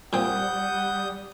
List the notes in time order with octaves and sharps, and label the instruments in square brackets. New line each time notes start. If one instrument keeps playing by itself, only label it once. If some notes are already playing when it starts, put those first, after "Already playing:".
[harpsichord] A#2 C4 [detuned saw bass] G3 [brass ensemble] F#5 [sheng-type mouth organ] D#6 G6